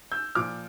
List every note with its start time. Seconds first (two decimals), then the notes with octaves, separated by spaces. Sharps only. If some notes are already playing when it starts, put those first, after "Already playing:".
0.12 E6 G6
0.35 A#2 F3 D6 F6